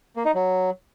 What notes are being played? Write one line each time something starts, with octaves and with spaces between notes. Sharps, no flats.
A#3
D#4
F#3